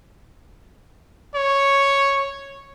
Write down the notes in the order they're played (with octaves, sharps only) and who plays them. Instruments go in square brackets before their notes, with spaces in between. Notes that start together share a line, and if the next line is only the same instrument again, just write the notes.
[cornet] C#5